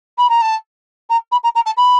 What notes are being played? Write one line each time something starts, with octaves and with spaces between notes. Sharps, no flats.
B5
A#5
A5
A#5
B5
A#5
A#5
A5
B5